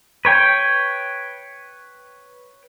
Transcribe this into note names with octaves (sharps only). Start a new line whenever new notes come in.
B4 C#5 G5